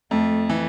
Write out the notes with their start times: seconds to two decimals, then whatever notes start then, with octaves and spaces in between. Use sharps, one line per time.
0.11 F2 A3
0.50 E3